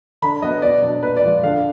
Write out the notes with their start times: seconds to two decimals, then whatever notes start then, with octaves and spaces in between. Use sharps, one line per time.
0.22 D3 B5
0.42 F#3 B3 D#5
0.62 B2 D5
0.82 F#3 D4
1.03 A#2 B4
1.17 D5
1.24 F3 G#3
1.44 D3 F5